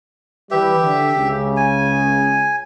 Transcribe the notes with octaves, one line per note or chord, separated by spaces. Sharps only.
E3 G3 G4 B4 E5
D3
C#2 C#3
G#5